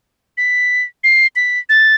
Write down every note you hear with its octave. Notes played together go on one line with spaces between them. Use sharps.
B6
C7
B6
A6